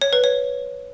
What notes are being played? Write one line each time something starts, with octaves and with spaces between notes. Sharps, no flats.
C#5
B4
C#5